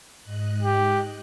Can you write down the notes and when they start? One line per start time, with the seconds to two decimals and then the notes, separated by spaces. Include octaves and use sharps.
0.22 G#2 D#5 F#6
0.63 G4